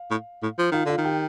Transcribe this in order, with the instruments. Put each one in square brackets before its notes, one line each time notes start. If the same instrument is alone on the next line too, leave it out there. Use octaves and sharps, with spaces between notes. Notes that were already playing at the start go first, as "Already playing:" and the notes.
Already playing: [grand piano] F5
[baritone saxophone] A2
A2
F3
[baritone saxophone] D#3 [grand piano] F4 F5
[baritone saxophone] D3 [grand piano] F4 F5
[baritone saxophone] D#3
[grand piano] G4 G5